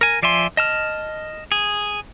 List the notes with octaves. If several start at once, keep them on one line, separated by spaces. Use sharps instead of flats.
A#4 G#5
F3 D5 E5 G#5 C6
D#5 A5 F6
G#4